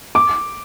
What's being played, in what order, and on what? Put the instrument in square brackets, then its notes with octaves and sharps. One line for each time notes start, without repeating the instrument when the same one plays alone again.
[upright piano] D6